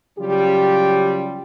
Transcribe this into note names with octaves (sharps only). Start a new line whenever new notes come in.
C#3 F#3 G3 F4 G4